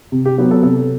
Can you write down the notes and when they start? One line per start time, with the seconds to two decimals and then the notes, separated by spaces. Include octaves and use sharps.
0.12 C3
0.25 G4
0.38 F#3 B3 G4
0.51 A4
0.63 C3 A4